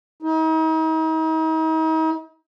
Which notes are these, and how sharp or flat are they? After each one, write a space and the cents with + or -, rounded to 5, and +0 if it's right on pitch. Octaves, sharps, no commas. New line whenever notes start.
D#4 +40